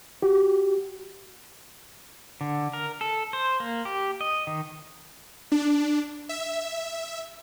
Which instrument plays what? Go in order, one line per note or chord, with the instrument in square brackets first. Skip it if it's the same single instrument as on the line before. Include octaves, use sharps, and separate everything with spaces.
[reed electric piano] F#4 G4
[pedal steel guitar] D3
A#4
A4
C5
A#3
G4
D#5
D#3
[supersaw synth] D4
E5